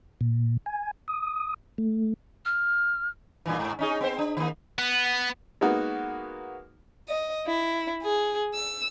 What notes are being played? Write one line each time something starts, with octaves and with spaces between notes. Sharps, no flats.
A#2
G#5
D#6
A3
F6
G2 A#2 E3
G#2
C#4 D#4 G#4
B3 C4 C5
D4
D#3 A#3
B3
G#3 A#3 B3 D#4 F#4
D#5
E4
G#4
E6